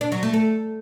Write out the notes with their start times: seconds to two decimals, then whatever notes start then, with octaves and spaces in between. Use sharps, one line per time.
0.01 D4
0.12 F#3
0.23 A3
0.34 A4